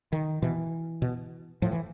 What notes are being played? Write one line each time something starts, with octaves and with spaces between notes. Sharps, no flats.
D#3
B2 E3
B2
A2 F3
E3